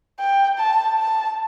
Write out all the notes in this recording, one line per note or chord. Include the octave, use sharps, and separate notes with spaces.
G5
A5
A5